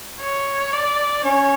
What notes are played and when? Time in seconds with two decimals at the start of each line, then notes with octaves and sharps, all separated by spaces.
0.20 C#5
0.73 D5
1.24 C#4 C#5